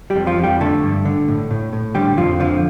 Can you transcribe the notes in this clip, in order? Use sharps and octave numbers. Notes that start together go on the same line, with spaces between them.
G3 G4
F2
F3 F4
F2
G3 G4
D3 A3 A4
G2
D3
A2
A2
A2
D3 G3 G4
F2 F3 F4
D3 F3 F4